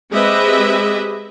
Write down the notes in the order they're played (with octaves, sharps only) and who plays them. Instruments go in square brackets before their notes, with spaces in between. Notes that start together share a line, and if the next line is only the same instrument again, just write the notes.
[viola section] G#3 C4 G4 B4 D#5 E5